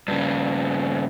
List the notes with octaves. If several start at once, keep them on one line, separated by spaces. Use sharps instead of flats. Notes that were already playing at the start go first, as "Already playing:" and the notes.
G2 C#3